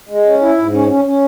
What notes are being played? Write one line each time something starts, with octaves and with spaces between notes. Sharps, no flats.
G#3
C#4
E4
G#2
C#4
C#4
C#4